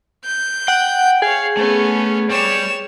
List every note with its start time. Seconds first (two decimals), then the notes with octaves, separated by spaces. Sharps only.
0.25 G6
0.68 F#5 G5
1.22 G#4 C#5 F5
1.57 A3 B3 C#4
2.30 G3 C#5 E7